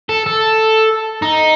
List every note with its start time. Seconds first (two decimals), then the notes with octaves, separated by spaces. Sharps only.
0.09 A4
0.26 A4
1.22 D#4